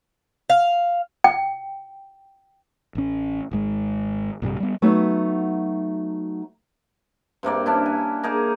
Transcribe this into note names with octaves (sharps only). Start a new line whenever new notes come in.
F5
G5
A1 C#4
G#1 G#2 G#3
A#1 G2 C3 G3
G3 B3
F#3 A3 B3 D#4 F#4
G2 C3 A#3 D5
C#4 D4 E4
G#5
A#3 D#4 G#4 A#4